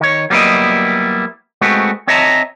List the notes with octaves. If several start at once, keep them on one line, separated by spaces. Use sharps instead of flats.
D#3 C#5
F#3 G3 A#3 B3 E4 D#5
G#3 A3 B3 C4 F#4
C4 C#5 D#5 E5 A5 A#5